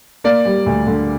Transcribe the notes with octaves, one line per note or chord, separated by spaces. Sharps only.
A#3 D5
G3
D2
D3